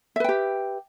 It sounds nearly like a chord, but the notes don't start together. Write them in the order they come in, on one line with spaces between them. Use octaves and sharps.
E5 B4 G5 G4